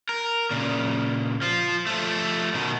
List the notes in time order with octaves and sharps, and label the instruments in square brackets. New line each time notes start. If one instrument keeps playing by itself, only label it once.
[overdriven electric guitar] A#4
A#2 C#3
F3 F4
F3 A3
B2 D#3